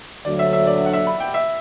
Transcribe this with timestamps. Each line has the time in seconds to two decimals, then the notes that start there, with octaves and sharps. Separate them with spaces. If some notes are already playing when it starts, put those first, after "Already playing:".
0.25 D2 D3 F#3 A3 D5
0.39 E5
0.53 E5
0.67 D5
0.86 F#5
0.93 E5
1.07 B5
1.20 G5
1.34 E5